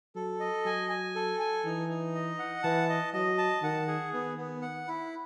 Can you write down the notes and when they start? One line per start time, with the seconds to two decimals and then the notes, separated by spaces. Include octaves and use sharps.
0.15 F#3 A4
0.40 D#5
0.65 F#3 G#5
0.89 G#5
1.15 A4
1.40 G#5
1.65 E3 D#4
1.89 D#4
2.15 D#5
2.39 F#5
2.63 E3 A5
2.89 D#5
3.14 F#3 D#5
3.38 A5
3.63 D#3 F#5
3.88 G#4
4.13 D#3 B3
4.38 B3
4.62 F#5
4.88 E4